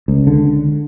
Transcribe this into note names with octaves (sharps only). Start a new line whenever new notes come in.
C#2
D3